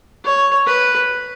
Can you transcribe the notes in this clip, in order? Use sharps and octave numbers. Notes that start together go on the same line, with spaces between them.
C#5
B4